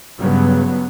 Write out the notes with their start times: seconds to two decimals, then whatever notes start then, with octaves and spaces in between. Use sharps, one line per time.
0.18 G2 C#3 F#3 B3